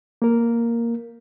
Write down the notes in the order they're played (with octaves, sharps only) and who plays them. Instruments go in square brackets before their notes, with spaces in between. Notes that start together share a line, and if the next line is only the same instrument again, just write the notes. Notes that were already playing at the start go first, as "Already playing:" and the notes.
[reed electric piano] A#3 A#4